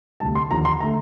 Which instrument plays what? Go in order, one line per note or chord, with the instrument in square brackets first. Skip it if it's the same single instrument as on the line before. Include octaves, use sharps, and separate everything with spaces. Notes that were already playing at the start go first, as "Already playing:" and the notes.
[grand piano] D2 C3 G3 A5
C6
D#2 D3 F3 A#5
C6
D3 A3 A#5